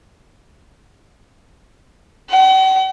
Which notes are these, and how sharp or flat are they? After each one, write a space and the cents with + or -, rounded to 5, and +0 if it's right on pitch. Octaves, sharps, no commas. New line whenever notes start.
F#5 +45